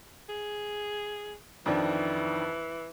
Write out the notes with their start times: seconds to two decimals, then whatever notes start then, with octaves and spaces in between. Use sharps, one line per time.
0.29 G#4
1.66 F2 D#3 E3 D4